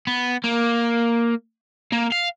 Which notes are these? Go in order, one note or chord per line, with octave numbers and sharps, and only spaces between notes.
B3
A#3
A#3
F5